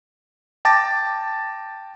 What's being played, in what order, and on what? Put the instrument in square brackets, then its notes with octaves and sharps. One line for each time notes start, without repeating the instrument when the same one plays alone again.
[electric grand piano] G5 A5 D6 A6 A#6